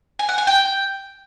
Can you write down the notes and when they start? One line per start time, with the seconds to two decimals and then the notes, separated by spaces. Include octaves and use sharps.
0.19 G#5
0.29 F#5
0.38 G#5
0.47 G5